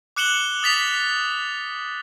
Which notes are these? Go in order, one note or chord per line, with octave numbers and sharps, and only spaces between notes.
D6 F#6 C#7 E7 F#7 G7
D#6 A6 B6 F7